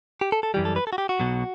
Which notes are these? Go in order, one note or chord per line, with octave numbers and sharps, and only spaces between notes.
G4
A4
A4
F#2 E3 G3 G4
A4
B4
A4
F#4
G4
F#4
B1 B2 F#3